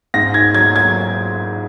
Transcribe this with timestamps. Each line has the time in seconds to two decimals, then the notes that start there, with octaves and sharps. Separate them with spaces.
0.14 G#2 A#6
0.34 G#6
0.54 F#3 G#6
0.76 G#6